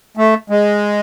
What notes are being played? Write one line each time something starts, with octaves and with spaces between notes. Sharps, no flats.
A3
G#3